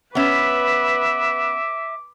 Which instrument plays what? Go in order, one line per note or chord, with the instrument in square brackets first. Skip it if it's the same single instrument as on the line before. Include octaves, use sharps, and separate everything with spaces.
[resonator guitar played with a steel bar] B3 C#4 [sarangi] B4 [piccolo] E5 [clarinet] D6